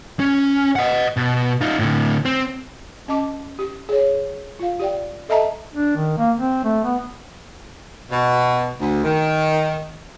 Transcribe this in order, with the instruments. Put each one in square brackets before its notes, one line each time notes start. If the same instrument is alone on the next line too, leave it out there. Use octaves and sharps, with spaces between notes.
[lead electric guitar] C#4
D#5 F#5
B2
D#4 F4
A2 D3
C4
[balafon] C#4 D#5 A5 D6
G4
G#4 C#5
F4 F5
G4 D5 G5
A4 D#5 E5 A5 A#5
[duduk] D4
D#3
A#3
C4
A3
B3
[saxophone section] B2
D2
D#3